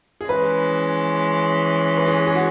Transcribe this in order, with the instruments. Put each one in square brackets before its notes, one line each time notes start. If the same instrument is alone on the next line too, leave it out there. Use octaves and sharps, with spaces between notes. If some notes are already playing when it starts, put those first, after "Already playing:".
[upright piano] G#4
[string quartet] E3 G#3 C#4 [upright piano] B4
[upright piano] B4
G#4
G#4
F#4